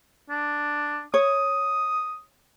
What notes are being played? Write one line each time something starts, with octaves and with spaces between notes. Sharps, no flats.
D4
C#5 D#6